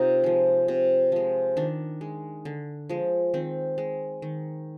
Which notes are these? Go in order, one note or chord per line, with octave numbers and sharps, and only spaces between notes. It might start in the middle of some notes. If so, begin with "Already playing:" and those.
Already playing: C3 D#4 F4
F3 G#3
C3
F3 G#3
D#3 D4
G#3
D3
F3 G#3
D#3 C4
G#3
D#3